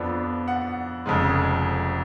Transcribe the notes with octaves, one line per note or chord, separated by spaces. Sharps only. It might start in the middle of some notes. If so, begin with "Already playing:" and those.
Already playing: F2 F3 B3 D4
F#5
F1 F2 C#3 G#3